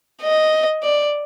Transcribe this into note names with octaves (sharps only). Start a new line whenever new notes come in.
D#5
D5